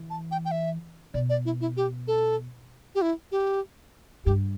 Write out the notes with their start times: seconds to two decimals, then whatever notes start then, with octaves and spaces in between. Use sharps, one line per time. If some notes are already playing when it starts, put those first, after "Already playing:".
Already playing: E3
0.10 A5
0.31 G5
0.45 G5
0.51 E5
1.14 B2 D5
1.30 D5
1.45 E4
1.61 E4
1.77 G4
2.08 A4
2.95 G4
3.02 E4
3.32 G4
4.25 G2 G4